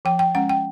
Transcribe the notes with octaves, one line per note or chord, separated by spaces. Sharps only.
F3 G5
G5
G#3 C#4 F#5
G5